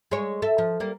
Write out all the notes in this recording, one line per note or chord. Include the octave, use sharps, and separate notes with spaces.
G#3 C#5
A4 E5
F3
G3 A#3